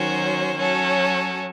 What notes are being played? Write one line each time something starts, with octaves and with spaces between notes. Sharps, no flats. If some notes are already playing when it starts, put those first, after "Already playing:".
Already playing: D#3 F#3 C#4 F#4 C5
F#3 C#4 F#4 A4